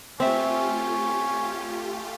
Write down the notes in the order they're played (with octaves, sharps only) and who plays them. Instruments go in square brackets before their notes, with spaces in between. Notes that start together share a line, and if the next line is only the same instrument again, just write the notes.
[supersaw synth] A3 F4 G4 [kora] C4 E5 [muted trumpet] C#4